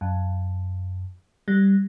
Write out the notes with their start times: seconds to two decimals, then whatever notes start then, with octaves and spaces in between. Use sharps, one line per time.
0.01 F#2
1.48 G3